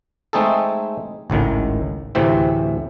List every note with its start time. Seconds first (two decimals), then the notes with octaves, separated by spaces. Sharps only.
0.33 G#3 A3 C4 D#4 G#4 A4
1.30 G#1 C#2 A2 D#3
2.15 D2 A2 C3 E3 C4